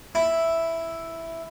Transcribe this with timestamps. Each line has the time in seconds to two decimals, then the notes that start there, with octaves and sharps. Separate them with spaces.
0.15 E4